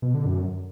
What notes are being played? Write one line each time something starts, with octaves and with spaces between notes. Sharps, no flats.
B2
D3
F#2